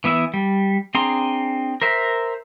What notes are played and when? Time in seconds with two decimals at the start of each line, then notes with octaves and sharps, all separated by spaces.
0.04 E3 B3 E4 E5
0.34 G3
0.95 C4 D4 G#4 A#5 C6
1.82 A#4 C5 E5